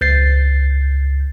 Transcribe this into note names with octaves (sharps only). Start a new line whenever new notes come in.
C#2 G6 A6 C7